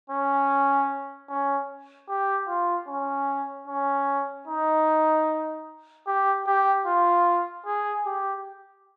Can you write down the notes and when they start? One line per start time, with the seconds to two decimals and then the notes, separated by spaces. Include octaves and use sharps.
0.10 C#4
1.29 C#4
2.09 G4
2.48 F4
2.88 C#4
3.68 C#4
4.48 D#4
6.07 G4
6.47 G4
6.87 F4
7.66 G#4
8.06 G4